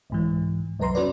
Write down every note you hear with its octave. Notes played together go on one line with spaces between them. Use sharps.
C2 G#2 E3
C2 F#2 B4 A#5 C6
C#4 F#4 B4 D5